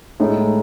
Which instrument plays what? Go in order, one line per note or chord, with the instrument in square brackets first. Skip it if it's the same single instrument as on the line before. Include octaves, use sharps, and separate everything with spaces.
[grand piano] A2 G#3 D#4